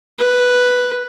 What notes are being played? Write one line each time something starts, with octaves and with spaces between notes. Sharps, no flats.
B4